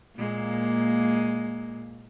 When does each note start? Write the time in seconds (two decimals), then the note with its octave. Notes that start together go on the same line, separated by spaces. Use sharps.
0.16 A#2 G#3 A#3